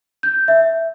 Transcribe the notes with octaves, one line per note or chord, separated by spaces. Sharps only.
G6
E5